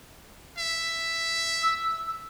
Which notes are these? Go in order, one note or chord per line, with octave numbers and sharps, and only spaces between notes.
E5
E6